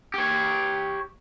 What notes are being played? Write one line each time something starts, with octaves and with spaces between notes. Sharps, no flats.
G4 C#5